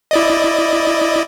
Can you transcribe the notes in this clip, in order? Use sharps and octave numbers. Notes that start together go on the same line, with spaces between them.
E4 D5 D#5